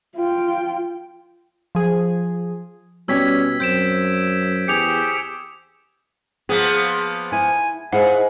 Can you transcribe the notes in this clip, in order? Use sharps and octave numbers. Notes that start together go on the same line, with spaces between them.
F4 G5
F3 G#4
B2 G3 C#4 G4 E6 G#6 B6
F#2 C4 G6 D7 E7
E2 G4 G#4 G5 C#7 F7
F3 A#3 B3 G#4
E4 G#5
G#2 E4 G#4 C5 F5 F#5